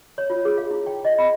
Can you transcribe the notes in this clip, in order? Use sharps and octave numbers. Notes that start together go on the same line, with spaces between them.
C#5
F4
G#4
F5
E4
G5
D#5
B5